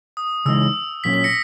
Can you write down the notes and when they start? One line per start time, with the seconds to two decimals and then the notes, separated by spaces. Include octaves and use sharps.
0.17 D#6
0.46 C#3 E3 G#3 D#4 E6
1.04 A#2 F#3 C#4 B6
1.14 B6
1.24 A#6 C#7